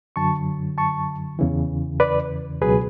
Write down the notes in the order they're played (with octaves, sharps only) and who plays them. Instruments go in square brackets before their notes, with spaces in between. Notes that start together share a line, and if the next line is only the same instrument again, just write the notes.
[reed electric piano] F#2 D3 F#3 A5 C#6
A5 C#6
E2 C#3 E3
B4 D5
C#2 B2 F#3 G#4 B4